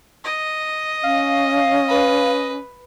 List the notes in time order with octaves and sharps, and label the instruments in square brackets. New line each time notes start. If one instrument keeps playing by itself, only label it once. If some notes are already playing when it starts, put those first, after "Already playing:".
[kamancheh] D#5
[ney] C#4 [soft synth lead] F5
[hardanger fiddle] B4